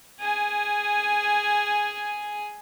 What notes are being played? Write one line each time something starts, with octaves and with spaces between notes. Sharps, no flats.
G#4 G#5